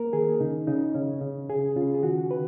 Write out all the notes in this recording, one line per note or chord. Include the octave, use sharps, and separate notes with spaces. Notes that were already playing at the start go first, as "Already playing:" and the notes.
Already playing: A#3 A#4
D#3 G#4
C#3 D#4
C#3 D#4
C#3 C#4
C#3
C#3 G#4
C#3 F4
G#4
D#3 F#4
D#3 B4